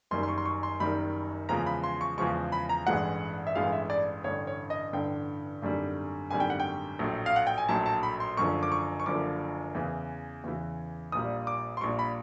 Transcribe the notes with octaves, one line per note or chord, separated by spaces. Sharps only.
F#1 F#2 D#3 G3 C6
C6
C#6
C6
C#6
C6
F#1 F#2 D#3 G3 B5
E2 C#3 F3 G#3 A#5
B5
C6
C#6
E2 C#3 F3 G#3 C#6
B5
A#5
A1 G2 E3 G#3 F#5
E5
A1 G2 E3 G#3 F5
E5
D5
A1 G2 D3 C#5
C#5
D#5
A1 G2 D3 G5
G#1 F#2 D3 G3
G#1 F#2 D3 G3 G#5
G5
F#5
G5
A#1 A2 F#3
F5
F#5
G5
G#5
A#1 A2 F#3 A5
A5
B5
C6
F#1 F#2 D3 F3 C#6
D6
C#6
C#6
F#1 F#2 D3 F3 D6
E2 C#3 E3
E2 C#3 E3
A#1 A#2 G3 D#6
D6
C6
A#1 A#2 G3 C#6
B5